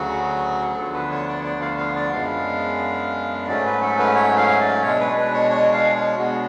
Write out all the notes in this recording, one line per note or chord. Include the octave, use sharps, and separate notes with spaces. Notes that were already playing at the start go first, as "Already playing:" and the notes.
Already playing: D2 C#3 F#3 F#4
D2 D3 F3 B3 D4 A4
B4
C#5
D5
D5
F5
F5
D5
F#2 C#3 G#3 B3 D4 F5
G#2 F#3 A3 C#4 D5
B4
A4
B4
C#5
F5
D5
B2 G#3 D4 C#5
B4
B4
C#5
C#5
F5
C#5
B2 G#3 B3 D4 F#4